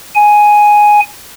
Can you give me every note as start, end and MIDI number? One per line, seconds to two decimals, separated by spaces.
0.15 1.00 80